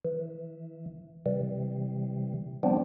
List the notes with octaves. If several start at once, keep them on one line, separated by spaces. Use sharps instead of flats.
E3
C3 E3 G3
F3 G3 B3 C4 D4